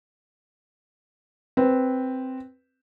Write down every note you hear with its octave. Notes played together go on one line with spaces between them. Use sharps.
C4 B4